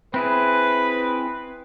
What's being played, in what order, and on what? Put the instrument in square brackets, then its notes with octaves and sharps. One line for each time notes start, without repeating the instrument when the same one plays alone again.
[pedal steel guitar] C4 E4 G#4 [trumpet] B4